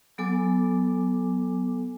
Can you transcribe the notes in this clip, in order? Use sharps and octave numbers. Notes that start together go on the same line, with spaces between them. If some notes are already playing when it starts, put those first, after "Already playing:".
F#3 B3 A4 G#5 D6